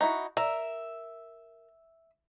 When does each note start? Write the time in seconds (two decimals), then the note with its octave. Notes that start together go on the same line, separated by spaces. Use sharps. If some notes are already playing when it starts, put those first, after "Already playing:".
0.01 D#4 E4 F#4
0.37 A#4 E5